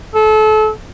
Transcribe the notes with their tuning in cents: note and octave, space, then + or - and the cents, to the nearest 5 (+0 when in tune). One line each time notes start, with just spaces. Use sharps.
A4 -30